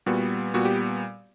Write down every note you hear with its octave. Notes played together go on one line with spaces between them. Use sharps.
A#2 G3 B3 F#4
A#2 G3 B3 F#4
G4